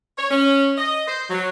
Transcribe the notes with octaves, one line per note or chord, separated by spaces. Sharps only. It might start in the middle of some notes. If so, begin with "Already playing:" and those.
C#5
C#4
D#5
C5
F#3